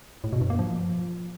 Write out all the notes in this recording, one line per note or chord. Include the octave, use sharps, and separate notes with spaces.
A2
B2
G2
A#3
F3